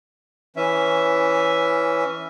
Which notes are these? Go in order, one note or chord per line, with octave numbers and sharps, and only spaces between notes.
E3 C#4 E5